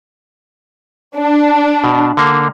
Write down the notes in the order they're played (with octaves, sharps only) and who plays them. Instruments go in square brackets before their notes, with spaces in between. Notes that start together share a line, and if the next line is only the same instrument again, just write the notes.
[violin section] D4
[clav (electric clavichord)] B2
D3 A#3